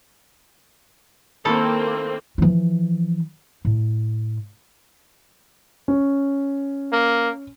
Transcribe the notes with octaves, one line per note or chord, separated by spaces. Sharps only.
D#3 A#3 C4 E4 A4
E3 F3
A2
C#4
A#3